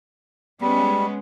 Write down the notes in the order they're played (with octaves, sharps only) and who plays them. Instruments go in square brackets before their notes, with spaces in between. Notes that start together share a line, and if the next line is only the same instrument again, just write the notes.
[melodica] G3 [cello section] G#3 B3 C#4